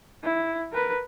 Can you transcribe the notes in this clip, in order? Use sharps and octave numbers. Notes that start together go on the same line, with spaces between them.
E4
A#4 B4